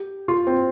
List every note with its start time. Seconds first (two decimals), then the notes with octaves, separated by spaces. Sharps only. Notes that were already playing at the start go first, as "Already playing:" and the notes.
Already playing: G4
0.28 F4
0.47 C4